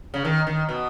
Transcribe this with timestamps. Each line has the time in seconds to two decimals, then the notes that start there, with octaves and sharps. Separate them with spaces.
0.14 C#3
0.25 D#3
0.47 D#3
0.69 B2